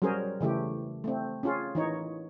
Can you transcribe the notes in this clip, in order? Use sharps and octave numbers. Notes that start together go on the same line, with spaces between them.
F#3 G3 C#4 G#4 A#4 C5
C#3 E3 A3 G4
A3 C4
C#4 F4 G#4
E3 D#4 C#5